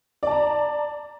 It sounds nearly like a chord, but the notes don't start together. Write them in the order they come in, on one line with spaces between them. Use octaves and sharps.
D5 A5 A#5